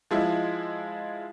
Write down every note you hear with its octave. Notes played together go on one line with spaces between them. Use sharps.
F3 G#3 E4